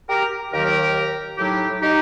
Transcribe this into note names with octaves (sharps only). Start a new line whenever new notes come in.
G4 A#4
D#2 D#3 F#3 G4 A#4
A2 F#3 D#4 G4
D#4 G4